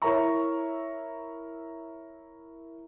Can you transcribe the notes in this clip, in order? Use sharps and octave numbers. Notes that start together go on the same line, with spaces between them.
E4 A#4 C#5 E5 A#5 C#6